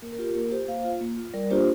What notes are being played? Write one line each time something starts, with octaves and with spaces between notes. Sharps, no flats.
A#3 A#4
A#4
F4 G4
A#3 A#4
F4 G4 C5
A#3 C5 F5
F4
A#3
F4
G3 A#4 D5
A#3 D4 F4 G4 C5